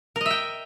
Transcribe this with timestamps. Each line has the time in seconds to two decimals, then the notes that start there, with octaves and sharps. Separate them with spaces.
0.16 A#4
0.21 D#5
0.26 E5
0.31 G5